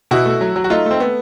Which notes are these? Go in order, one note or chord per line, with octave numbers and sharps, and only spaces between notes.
B2 E4 F#4
A3
F#3
F#3
F#4
A3 D#4 F4
A3
C4
A3 B3